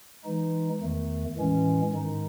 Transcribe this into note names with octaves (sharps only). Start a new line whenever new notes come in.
E3 G#3 D#4
E2 D#3 A3
A2 E3 G#3 C#4
G#2 D#3 G#3 D#4